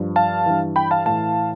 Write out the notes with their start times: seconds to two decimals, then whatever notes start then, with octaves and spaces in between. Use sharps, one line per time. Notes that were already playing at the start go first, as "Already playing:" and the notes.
Already playing: G2 F3
0.16 F5 A5
0.46 G2 E3
0.76 G5 B5
0.91 F5 A5
1.06 A2 E3 F5 A5